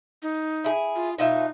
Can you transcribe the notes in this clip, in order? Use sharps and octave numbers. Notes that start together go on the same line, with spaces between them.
D#4
E4 G#4
F4
B2 D#4 F4 E5